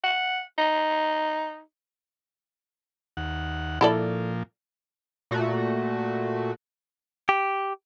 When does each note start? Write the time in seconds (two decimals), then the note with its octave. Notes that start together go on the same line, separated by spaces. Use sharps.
0.04 F#5
0.58 D#4
3.17 D#2 F#5
3.81 A#2 F3 E4 A4 D5
5.31 A#2 A3 F#4
7.29 G4